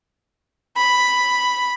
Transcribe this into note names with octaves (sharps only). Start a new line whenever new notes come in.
B5